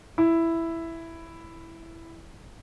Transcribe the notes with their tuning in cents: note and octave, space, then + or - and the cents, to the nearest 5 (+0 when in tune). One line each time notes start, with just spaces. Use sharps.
E4 +5